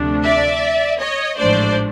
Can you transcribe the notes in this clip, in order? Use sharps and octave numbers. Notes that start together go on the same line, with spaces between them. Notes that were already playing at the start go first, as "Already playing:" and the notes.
Already playing: D2 C3 F3 A3 D4
D5 E5
C#5 D#5
A1 G#2 F3 A3 D4 C5 D5